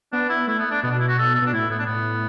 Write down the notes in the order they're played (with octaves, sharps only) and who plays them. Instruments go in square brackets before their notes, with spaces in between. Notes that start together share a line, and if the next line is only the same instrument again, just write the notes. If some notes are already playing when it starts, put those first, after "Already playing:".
[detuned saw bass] B3 [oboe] D4
[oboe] E4
[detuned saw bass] A3 [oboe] E4
[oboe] B3
D4
[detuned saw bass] B2 [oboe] B3
[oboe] D4
E4
F#4
A4
A4
[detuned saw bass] B2 [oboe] D4
[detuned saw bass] A2 [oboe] E4
[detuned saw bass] A2 [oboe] B3
[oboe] D4
[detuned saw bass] A2 [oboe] B3